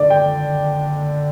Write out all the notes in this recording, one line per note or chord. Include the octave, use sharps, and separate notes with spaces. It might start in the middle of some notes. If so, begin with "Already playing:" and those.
Already playing: D3 D5
G5